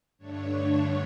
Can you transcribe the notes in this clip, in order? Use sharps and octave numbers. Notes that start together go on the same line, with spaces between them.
G2 D3 A3 D4 C#5